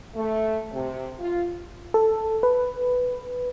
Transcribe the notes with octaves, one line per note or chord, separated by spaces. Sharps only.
A3
C3
F4
A4
B4